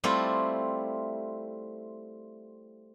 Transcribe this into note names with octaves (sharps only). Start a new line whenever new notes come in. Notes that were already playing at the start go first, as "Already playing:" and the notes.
G3 A3 C4 E4 F4